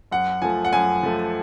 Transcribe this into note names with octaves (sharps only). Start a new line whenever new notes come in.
F#2 F#5
F3 A3 G#5
F#5
F#2 G#5
F3 A3